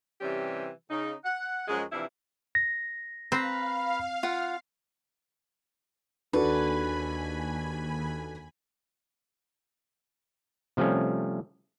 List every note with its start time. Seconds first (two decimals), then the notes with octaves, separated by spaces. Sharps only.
0.21 C3 E3 G3 C4 C#4 G4
0.90 C#3 D#4
1.24 F#5
1.67 F#2 F3 F#3 G#3
1.92 C3 E3 F3 D4 E4
2.55 A#6
3.32 C4 B4 F5 A#5
4.23 F4 F#5
6.33 D#2 D4 F#4 A4 B4 G#5 B5
10.77 C3 F3 G3 A3 C#4